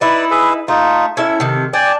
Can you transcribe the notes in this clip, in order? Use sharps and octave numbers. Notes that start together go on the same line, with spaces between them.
D#4 E4 B4 D5
G#4 B4 E5
A3 D#4 F4
C#4 E4 A4 E5
C3 D#3
D4 D5 G5 G#5